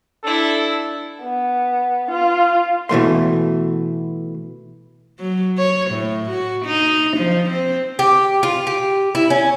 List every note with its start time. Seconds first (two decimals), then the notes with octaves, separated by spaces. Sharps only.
0.24 D4 E4 A4
1.22 B3
2.11 F4
2.89 B2 E3 A3 C6
5.19 F#3
5.58 C#5
5.91 A2
6.30 F#4
6.65 D#4
7.17 F3
7.50 C4
7.99 G4
8.43 F4
8.67 G4
9.15 E4
9.30 C#4